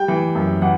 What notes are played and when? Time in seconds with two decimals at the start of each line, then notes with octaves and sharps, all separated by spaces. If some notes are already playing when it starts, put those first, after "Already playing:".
Already playing: G3 G5
0.08 E3
0.35 F#2
0.62 E3 F#5